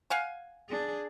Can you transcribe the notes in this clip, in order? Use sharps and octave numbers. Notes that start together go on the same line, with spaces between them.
F5 F#5 G#5
D4 G#4